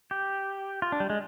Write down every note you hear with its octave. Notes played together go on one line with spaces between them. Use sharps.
G4
F4
D4
G3
G#3